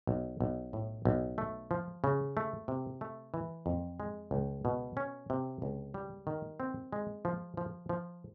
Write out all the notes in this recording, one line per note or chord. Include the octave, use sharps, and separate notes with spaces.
B1
B1
A2
B1
A3
F3
C#3
A3
C3
A3
E3
F2
G#3
C#2
B2
C#4
C3
C#2
G3
D#3
C4
G#3
F3
F3
F3